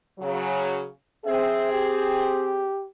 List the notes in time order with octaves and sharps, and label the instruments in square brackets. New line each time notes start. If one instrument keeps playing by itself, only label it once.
[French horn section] C#3 F#3
[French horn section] C4 G#4 [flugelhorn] E5
[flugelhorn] G4